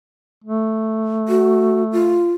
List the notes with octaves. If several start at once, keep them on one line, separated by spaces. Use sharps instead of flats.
A3
F#4
F4